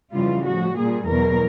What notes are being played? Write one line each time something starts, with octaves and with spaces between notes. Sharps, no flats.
F2 C#3 E3 G3 F4
A2 F3 F#4
A#2 G3 G#4
E2 B2 F#3 A#4